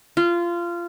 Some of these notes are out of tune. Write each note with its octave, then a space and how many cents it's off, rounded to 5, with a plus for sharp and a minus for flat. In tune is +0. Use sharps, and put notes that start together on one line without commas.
F4 -20